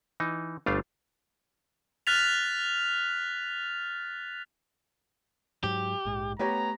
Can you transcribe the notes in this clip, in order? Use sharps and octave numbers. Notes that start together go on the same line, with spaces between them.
E3 D#4
G1 G3 A3 D4 F4 F5
F6 F#6 A6 B6 F7
G#2 F#3 G4
A#1 G#2
A3 B3 G4 C#5 A#5